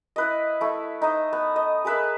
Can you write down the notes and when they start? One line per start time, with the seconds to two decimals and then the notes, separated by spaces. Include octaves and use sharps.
0.16 E4 B4 D#5
0.61 A3 E4
1.02 D#4 C5 D#5 E5
1.33 B3
1.56 D#5
1.85 G#4 A#4 B4 E5